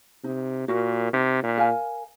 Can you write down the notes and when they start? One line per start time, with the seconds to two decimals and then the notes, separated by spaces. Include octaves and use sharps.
0.24 C3 D#4
0.68 A#2 F#4 A#4
1.13 C3 D#4
1.43 A#2
1.58 A#4 F5 G#5